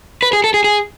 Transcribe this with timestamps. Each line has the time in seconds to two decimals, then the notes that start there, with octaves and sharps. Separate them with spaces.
0.23 B4
0.33 G#4
0.44 A4
0.54 G#4
0.64 G#4